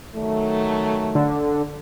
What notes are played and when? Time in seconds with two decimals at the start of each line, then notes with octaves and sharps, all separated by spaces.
0.15 D#3 F#3 A3
1.15 D3